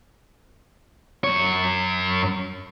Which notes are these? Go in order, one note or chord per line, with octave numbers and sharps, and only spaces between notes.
F#2 C#5